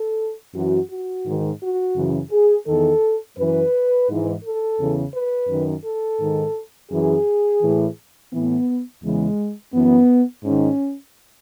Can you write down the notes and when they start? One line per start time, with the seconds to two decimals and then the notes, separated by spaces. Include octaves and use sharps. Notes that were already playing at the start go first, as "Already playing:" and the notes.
Already playing: A4
0.54 F#2 E3 F#4
0.90 F#4
1.25 G#2 D#3
1.61 F#4
1.95 F#2 C#3 E3
2.31 G#4
2.67 E2 D#3 A4
3.37 F#2 E3 B4
4.08 G#2 E3
4.43 A4
4.78 E2 C#3 E3
5.14 B4
5.49 F#2 D#3
5.85 A4
6.20 G#2 D#3
6.90 F#2 E3 G#4
7.61 A2 E3
8.32 A2 E3 B3
9.02 E2 C#3 E3 G#3
9.73 F#2 E3 B3
10.43 G#2 D#3 C#4